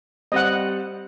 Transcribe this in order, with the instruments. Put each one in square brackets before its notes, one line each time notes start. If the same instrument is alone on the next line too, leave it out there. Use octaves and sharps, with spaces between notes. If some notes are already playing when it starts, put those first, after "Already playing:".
[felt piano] G3 C4 [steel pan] D#5 F#5